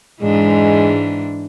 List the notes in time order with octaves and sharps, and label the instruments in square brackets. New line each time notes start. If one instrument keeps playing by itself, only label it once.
[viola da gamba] G#2 E3 D4 [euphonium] G#3